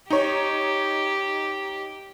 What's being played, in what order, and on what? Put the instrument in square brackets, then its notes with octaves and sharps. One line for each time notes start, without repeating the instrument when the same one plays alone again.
[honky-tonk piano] D#4 C#5 [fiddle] G4